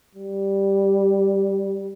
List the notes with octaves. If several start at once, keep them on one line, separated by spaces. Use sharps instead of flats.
G3